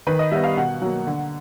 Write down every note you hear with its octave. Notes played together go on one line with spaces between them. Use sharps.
D#3 B4
D#5
G3 B3 E5
F5
B2 F#5
F#3 A#3
D3